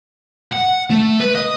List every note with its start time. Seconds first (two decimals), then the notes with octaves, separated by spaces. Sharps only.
0.53 F#5
0.90 A3
1.20 B4
1.35 D#5